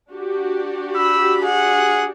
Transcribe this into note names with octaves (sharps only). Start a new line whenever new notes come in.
D4 F#4 G4
B5 E6
G#4 F#5